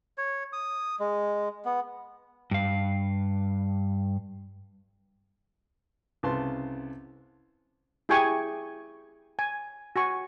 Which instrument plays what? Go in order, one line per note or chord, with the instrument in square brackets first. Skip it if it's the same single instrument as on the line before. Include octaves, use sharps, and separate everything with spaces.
[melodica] C#5
D#6
G#3
B3
[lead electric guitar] G2 F5
[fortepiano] C2 C#3 B4 A5 C6
[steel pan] E4 G4 G#4 G5 G#5 C#6
G#5
F#4 G#5 C#6